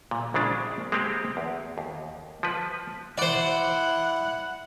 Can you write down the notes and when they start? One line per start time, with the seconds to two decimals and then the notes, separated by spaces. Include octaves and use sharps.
0.11 A#2
0.34 A#1 C#3 G#3 D4
0.92 G#3 A#3 C4 G4
1.37 E2
1.78 D#2
2.43 F3 B4
3.18 E4 C5 D5 F#5